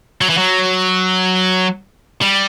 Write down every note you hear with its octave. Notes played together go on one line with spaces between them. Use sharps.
F#3
E3
F#3
G3